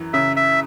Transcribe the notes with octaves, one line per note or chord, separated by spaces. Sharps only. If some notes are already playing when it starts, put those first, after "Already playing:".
Already playing: F#2 E3
C#3 E5
E5